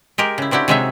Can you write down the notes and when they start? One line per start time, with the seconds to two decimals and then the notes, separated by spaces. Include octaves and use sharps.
0.18 G#3 G4 A#4
0.38 C#3 E4
0.51 C4 D4 E4 F#4 G4
0.68 C3 F#3 G#3 D#4 C#5 E5